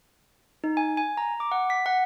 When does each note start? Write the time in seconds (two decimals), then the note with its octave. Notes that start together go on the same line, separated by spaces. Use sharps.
0.64 D#4
0.77 G#5
0.97 G#5
1.17 A#5
1.40 D6
1.52 F#5
1.70 B6
1.86 F#5